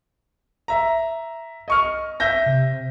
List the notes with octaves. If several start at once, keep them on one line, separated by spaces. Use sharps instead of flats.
E5 A#5
D#5 C#6 F6
E5 G6 A#6
C3